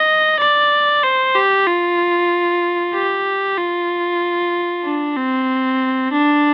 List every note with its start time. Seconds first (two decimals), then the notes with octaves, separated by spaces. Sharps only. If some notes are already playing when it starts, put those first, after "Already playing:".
Already playing: D#5
0.40 D5
1.04 C5
1.36 G4
1.66 F4
2.94 G4
3.57 F4
4.85 D4
5.16 C4
6.13 D4